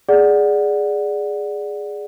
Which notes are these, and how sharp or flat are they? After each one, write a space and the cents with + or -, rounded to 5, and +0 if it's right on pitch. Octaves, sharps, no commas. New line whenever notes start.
G#4 +0 D5 +0 F#5 +0